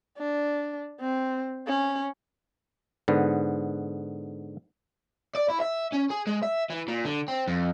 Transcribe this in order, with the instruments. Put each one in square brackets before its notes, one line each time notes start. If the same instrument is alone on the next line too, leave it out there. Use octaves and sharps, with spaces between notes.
[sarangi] D4
C4
C#4
[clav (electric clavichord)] G#2 D3 B3
[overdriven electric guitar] D5
E4
E5
C#4
G#4
G#3
E5
E3
A#2
D3
C4
F2